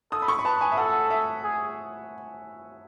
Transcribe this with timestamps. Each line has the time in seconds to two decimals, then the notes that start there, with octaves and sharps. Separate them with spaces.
0.12 A4 D#6
0.22 B5
0.28 C#6
0.39 B5
0.44 B4 A5
0.61 G#5
0.72 E5
0.77 A4 F#5
1.10 E5
1.43 G#4